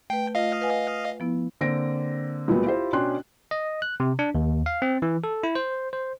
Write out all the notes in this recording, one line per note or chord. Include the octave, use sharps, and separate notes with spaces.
A3 B4 G5
A3 F4 D#5 F5
B4 F#5 G#5
F3 B3 E4
D3 A#3 C4 A#6 D7
C#2 A#2 F#3 B3
E4 F4 G4 C5
B2 C#4 D4 G5 C6 F#6
D#5
F#6
C3
D4
D#2
F5
C4
E3
A4
E4
C5
C5